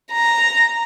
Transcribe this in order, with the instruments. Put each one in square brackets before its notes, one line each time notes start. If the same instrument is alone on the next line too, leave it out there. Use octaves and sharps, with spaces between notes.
[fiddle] A#5